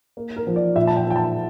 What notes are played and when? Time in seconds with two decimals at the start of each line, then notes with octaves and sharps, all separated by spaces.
0.17 A#3
0.36 A#4
0.47 F3
0.56 D5
0.76 A#2 E5
0.87 A5
0.96 G5
1.07 A#2 G5
1.16 A5